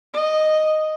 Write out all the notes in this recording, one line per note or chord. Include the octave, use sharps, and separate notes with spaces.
D#5